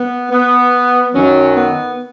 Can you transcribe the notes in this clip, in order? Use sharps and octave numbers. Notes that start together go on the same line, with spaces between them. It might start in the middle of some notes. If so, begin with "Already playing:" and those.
Already playing: B3
B3
F#2 D#3 F#3 C#4
B3